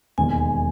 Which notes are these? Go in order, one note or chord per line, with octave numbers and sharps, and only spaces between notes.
E1 D#2 D#3 G#3 G#5